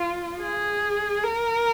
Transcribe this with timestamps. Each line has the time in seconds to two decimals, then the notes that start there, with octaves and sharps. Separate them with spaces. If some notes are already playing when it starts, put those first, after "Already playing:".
Already playing: F4
0.39 G#4
1.24 A#4